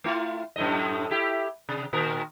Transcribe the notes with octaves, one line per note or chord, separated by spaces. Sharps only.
A3 E4 F4
F#2 A2 D#5
E4 G4
C3
A#2 D#3 A#4